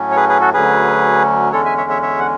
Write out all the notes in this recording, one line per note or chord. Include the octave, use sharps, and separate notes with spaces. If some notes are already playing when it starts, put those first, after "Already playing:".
Already playing: A2 F#3 C#4
C#5
G#4 B4
G#4 B4
F#4 A4
D2 D3 F#3 C#4 G#4 B4
E2 D3 G#3 C#4 A4 C#5
E5 G#5
C#5 E5
C#5 E5
C#5 E5
F#5